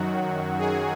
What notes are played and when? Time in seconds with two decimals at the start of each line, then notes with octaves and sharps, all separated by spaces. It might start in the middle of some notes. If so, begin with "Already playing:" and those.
Already playing: F#2 D#3 F#3 F#4
0.59 G#4